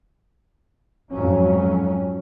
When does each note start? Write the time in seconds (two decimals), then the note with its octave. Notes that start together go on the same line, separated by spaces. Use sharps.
1.11 F2 G#2 F#3 C#4